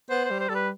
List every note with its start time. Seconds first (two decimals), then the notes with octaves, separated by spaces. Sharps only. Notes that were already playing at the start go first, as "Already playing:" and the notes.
0.10 B3 C5
0.25 C5
0.31 G3
0.40 C5
0.49 G3 A4
0.55 B4